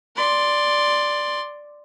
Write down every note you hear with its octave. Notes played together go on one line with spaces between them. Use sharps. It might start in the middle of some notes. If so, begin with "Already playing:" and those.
D5 C6